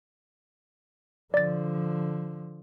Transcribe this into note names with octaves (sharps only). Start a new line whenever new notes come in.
D3 F3 D5 A6